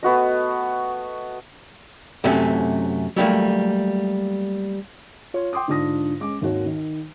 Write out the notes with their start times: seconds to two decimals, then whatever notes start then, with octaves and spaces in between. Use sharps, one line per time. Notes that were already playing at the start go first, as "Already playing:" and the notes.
0.03 A3 B3 F#4 D#5
2.24 F#2 C3 F#3 A3 C#4
3.16 F#3 G3 A3 A#3
5.34 F4 C#5
5.53 G5 C6 D6 D#6
5.68 G#2 D3 D4 F4 D#6 A#6
6.20 G#3 C#4 D6
6.41 G#1 D#2 F#4 C#5
6.66 D#3